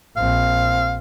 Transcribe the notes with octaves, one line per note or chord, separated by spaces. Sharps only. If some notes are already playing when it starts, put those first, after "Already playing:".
A#1 C4 F5